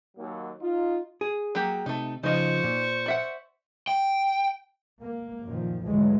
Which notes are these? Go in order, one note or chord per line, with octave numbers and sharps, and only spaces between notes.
D#2 F#3 A#3
D#4 F4
G#4
F#3 A#3 G4
C3 A3 D#4
C#3 F3 D#4 F4 C5 D#5 C#6
A#2
D5 E5 F#5
G5
A#3
F#2 A#2 D#3 F3
D2 G#2 D3 E3 F#3 G#3